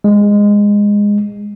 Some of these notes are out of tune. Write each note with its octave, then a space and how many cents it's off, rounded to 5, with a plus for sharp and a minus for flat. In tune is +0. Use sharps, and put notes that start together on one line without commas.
G#3 -15